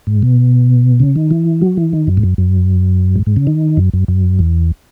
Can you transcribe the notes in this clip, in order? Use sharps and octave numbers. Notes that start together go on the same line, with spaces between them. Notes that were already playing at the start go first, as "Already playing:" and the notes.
G#2
B2
C#3
D#3
E3
F#3
E3
D#3
F#2
G#2
F#2
F#2
G#2
G#2
C#3
D#3
F#2
F#2
F#2
E2